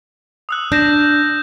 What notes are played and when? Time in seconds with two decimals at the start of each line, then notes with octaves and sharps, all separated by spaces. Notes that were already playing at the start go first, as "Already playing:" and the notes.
0.49 D#6 E6 F#6
0.72 D4 G6 A#6 E7